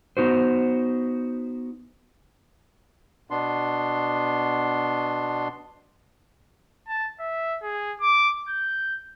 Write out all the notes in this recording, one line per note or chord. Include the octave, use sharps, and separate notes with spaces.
B3 D#4 F#4 C5
B2 B3 D4 C6
A5
E5
G#4
D6
G6